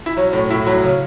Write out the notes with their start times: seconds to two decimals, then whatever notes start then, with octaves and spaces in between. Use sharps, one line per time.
0.06 E4
0.17 F#3 C#4
0.33 A2 C#4
0.50 A2 E4
0.67 F#3 E4
0.83 C#3 C#4